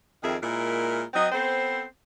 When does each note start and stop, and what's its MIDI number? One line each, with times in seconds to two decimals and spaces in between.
0.22 0.35 41
0.22 0.35 51
0.22 0.35 68
0.22 0.35 70
0.22 0.35 76
0.41 1.02 46
0.41 1.02 56
0.41 1.02 64
0.41 1.02 70
1.14 1.27 54
1.14 1.27 60
1.14 1.27 75
1.32 1.83 59
1.32 1.83 60
1.32 1.83 69
1.32 1.83 72